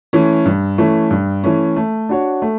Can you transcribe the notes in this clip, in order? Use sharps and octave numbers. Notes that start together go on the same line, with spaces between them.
E3 A3 C#4
G2
E3 A3 C#4
G2
E3 A3 C#4
A3
D4 F#4 C#5
A3